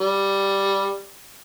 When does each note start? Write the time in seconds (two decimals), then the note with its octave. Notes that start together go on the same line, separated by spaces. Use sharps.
0.01 G3